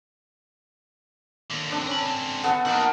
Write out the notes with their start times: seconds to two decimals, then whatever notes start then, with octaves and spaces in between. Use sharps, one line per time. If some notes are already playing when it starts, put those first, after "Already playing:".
1.51 D#2 D3
1.72 C4 D4
1.87 C#4 A#4 B5
2.06 D3 C4
2.44 B3 A4 F#5
2.66 D#3 A#3 F#4 A#4